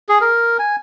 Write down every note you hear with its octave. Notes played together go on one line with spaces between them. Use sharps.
G#4
A#4
G#5